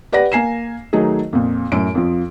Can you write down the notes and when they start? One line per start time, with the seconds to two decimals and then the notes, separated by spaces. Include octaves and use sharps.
0.12 G4 B4 D5 F#5 A#6
0.32 A#3 G#5 C7 E7
0.93 D#3 F#3 A3 D#4 G#4
1.33 F2 A#2
1.72 F#2 A2 D7
1.95 F2 F3